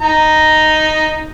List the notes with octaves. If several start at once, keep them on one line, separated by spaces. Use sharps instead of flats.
D#4 A#5